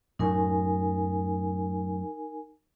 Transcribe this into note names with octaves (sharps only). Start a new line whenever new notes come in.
F#2 A2 F#3 D#4 A#4 G#5